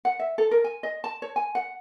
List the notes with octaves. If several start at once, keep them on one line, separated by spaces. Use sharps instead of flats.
F#5
E5
A4
A#4
G#5
D#5
A5
C#5
G#5
F#5